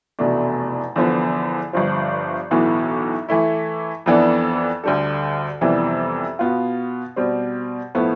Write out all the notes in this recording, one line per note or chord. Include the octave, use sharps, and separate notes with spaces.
F1 E2 B2 A3 D4
E2 D3 F3 B3
G1 G2 F3
B1 A2 E3 B3
E3 A3 E4
F2 E3 B3 D4 A4
D2 D3 G3 D4 A4
F2 C3 E3 G3 B3
B2 B3 F4
B2 G3 C4
A2 F3 B3